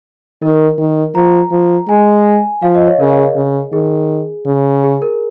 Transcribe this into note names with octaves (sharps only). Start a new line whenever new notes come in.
D#3 A#4
D#3
F3 A#5
F3
G#3 G#5
F3 F5
D#5
C#5
C#3 A#4
G#4
C#3
D#3 G#4
C#3
G#4
A#4